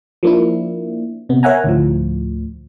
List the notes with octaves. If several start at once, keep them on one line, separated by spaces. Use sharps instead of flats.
F3 A#3 D4 E4
C3 B3
A#4 C#5 E5 F#5 G#5 A#5
D2 A2 F3